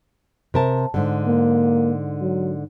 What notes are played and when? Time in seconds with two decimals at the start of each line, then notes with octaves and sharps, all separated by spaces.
0.54 C3 A#4 A5
0.94 G#2 D3
1.27 A#3
2.21 F#3